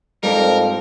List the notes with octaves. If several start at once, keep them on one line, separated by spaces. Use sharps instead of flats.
F2 G#2 G3 A#4